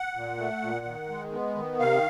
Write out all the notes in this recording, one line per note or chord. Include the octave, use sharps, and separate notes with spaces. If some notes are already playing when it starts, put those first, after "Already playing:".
Already playing: F#5
A#2
A3
A#2
D#3
G#3
B3
D#3
C3 F5